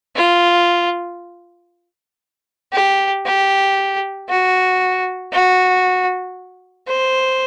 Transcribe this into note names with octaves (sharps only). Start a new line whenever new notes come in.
F4
G4
G4
F#4
F#4
C5